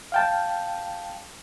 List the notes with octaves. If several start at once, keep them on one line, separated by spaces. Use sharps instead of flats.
F5 G5 A5